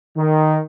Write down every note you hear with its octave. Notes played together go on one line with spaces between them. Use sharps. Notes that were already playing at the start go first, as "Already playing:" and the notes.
D#3